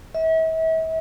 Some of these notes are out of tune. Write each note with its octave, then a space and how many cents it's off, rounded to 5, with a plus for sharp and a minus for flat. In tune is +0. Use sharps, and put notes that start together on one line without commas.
E5 -40